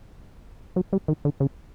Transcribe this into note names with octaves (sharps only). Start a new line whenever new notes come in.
F#3
G3
D#3
D3
C#3